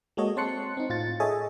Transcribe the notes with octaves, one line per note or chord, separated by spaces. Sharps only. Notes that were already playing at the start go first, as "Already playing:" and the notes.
G#3 A#3 F#4 A4 C#5 D#5
C4 C#5 A5 C6 F#6 C#7
C4 D#4
A2 F4 A6
G#4 A4 C#5 D#5 E5 G#5